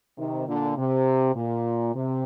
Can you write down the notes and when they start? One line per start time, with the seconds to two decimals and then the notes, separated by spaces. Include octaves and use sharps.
0.18 C3 D#3
0.47 A#2 D3
0.77 C3
1.35 A#2
1.95 C3